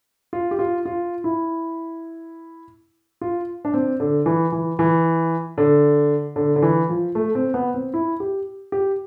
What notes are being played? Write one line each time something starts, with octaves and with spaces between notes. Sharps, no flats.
F4
G4
F4
F4
E4
F4
D4
C4
D3
E3
E3
E3
D3
D3
D3
E3
F3
A3
C4
B3
C4
E4
G4
G4